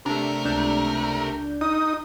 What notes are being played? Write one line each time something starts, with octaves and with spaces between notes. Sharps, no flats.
C3 A3 D4 A#4
C#2 D4 G6
D#4 D#6